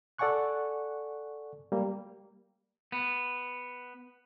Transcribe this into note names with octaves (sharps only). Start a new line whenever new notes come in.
A4 D5 F#5 G#5 C#6 F#6
G3 A#3
B3